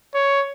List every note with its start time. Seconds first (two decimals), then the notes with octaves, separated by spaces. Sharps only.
0.14 C#5